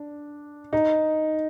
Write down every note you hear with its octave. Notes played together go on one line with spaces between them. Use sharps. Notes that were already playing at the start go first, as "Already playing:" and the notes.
Already playing: D4
D#4